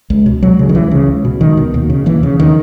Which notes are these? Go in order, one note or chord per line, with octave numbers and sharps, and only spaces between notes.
C#2
B2
C#2 F#3
C#3
D#3
C#2 E3
C#3
C#2
B2
C#2 D#3
B2
D#2
C#3
D#2 E3
C#3
D#3